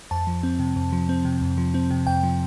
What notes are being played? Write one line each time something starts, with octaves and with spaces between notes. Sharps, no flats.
F2 A5
F3
C4
C3
F2
F3
C4
C3
F2
F3
C4
C3
F2 G5
F3